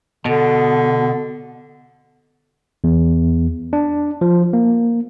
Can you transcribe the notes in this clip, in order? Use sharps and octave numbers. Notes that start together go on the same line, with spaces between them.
B2 D3
E2
D4
F3
A#3